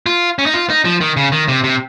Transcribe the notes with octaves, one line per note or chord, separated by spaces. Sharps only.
F4
C#4
D#4
F4
D#4
F3
D#3
C#3
D#3
C3
C3